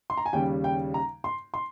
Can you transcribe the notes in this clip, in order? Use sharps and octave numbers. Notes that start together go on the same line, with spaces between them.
C6
A#5
G#5
D#2 C#3 G3 G5
G5
A#5
C6
C6